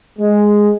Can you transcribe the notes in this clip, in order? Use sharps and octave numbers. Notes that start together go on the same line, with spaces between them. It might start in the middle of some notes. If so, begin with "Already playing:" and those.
G#3